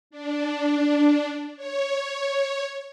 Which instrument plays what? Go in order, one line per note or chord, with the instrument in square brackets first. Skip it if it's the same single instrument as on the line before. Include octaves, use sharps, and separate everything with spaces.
[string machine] D4
C#5